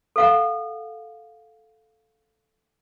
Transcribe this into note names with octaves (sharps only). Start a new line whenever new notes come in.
A4 F5 F#5